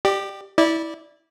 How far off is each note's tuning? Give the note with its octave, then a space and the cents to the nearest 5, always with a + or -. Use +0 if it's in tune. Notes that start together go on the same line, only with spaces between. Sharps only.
G4 -5 D5 +30
E4 -20 D5 +0